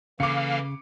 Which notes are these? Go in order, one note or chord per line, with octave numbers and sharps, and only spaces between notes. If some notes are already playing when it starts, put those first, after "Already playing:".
C#3 E3 A#3 A4 F5 D6 C#7